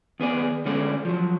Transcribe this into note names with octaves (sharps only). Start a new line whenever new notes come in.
D#2 B3 G#4 D5
D3 G#3 C#4 A4 D5
F3 F#3